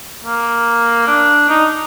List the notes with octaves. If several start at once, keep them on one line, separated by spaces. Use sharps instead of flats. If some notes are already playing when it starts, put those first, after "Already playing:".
A#3
D4
D#4